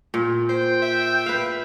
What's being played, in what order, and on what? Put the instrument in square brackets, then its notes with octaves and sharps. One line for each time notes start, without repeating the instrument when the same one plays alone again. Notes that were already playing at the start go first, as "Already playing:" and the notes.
[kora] A#2
[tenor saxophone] C5 [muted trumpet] G5
[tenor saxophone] E5
[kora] B4 F5